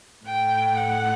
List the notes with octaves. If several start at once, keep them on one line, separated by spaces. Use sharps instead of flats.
A2 G5
F#5